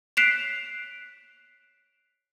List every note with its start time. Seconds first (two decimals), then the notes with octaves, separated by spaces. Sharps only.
0.17 F#6 B6 C7 D7 E7 F7